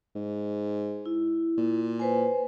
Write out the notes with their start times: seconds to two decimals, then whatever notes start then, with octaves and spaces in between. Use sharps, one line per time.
0.15 G#2
1.06 E4
1.57 A#2
2.00 B4 C5 G#5